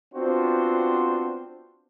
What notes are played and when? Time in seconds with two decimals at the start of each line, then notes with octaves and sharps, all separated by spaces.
0.14 B3 C4 D4 F4 F#4 C5